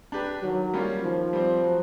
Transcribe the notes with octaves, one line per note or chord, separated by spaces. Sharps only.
D4 G4 B4
D#3 F#3
G3 A#3 C#4 F4
D#3 F3
G3 C4
F#3